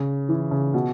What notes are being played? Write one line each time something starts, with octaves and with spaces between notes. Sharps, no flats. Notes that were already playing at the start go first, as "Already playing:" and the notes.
Already playing: C#3
E3
C#3
B2